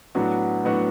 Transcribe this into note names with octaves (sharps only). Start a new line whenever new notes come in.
A2 F#3 B3 D4 F#4
A2 F#3 B3 D4 F#4